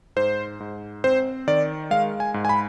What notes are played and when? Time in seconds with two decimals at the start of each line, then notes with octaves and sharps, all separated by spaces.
0.16 G#2 C5
0.60 G#2
1.04 C4 C5
1.48 D#3 D5
1.91 G#3 F5
2.20 G#5
2.34 G#2
2.45 G#5
2.49 B5